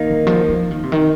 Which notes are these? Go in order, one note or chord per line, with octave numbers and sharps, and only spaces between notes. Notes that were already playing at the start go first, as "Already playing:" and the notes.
Already playing: D#3 A#3 D#4
C3
F3
F3
D#3
C3
D#3